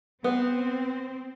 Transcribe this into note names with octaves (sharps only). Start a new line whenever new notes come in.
B3 C4